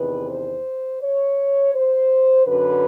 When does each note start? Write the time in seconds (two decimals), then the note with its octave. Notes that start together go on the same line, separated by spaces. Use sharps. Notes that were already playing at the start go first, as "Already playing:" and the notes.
Already playing: E2 C3 D#3 B4
0.29 C5
1.01 C#5
1.73 C5
2.45 F#2 D3 B4